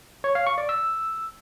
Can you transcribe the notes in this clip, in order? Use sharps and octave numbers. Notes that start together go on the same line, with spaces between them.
C#5
F5
C#6
D5
E6